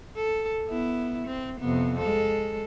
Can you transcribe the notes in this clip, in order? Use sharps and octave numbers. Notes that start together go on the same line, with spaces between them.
A4
B3 E4
C4
F2 C3 B3
G#3 A4